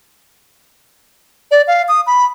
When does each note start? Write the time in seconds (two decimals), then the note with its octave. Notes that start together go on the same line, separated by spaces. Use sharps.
1.51 D5
1.68 F5
1.88 D#6
2.07 B5